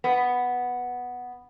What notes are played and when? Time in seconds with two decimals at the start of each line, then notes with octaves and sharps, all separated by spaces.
0.04 B3